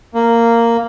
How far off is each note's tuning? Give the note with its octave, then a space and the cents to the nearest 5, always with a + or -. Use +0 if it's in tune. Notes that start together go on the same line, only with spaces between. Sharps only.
A#3 -10